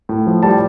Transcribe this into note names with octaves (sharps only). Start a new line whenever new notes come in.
A2
F3
G3 A5